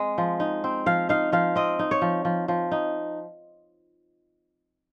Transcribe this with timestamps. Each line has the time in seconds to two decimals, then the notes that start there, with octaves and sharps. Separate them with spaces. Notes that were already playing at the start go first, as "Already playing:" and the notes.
Already playing: G#3 C4
0.18 F3
0.40 D#4
0.64 C4
0.86 F3 F5
1.09 D#4 F5
1.32 F3 F5
1.56 C4 D#5
1.79 D#4
1.91 C#5
2.02 F3
2.25 F3
2.48 F3
2.71 D#4